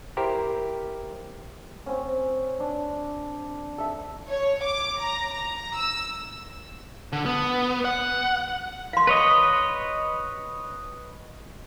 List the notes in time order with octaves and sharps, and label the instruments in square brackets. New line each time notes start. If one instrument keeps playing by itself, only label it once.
[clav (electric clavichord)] E4 G4 A#4 C5
[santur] C4 C#4
D4
A4 E5
[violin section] C#5
D6
A#5
A#5
E6
[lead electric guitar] D3
B3
F#5
[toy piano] F5 C6
[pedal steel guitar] B4 C#5 D#5